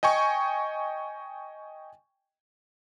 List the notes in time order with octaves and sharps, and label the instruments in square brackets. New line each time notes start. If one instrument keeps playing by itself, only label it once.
[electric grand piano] D#5 G5 G#5 C#6